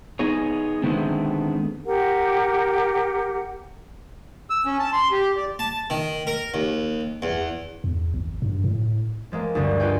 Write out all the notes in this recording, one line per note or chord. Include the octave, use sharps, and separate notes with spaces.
B3 D#4 G#4 C#5
D3 D#3 G#3 A3 B3 C4
G4 A#4 F#5
E6
C#4
A5
C6
G4
D5
A5
D#3
A#4
D#2
E2
E2
G#1
G2
A2
F3 G#3 A#3 B3
D2 G2 D3 G3
F4 F#4 B4 D#5 G5 G#5